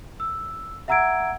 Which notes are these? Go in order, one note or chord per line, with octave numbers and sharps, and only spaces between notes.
E6
E5 F#5 A#5 E6 G#6 D7